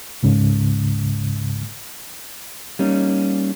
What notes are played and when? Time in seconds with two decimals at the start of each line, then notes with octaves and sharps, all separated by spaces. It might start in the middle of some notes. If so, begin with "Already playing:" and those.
0.23 C#2 G#2 C#3
2.79 G3 A#3 C#4 D#4